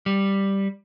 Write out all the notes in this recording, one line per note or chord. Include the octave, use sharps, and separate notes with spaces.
G3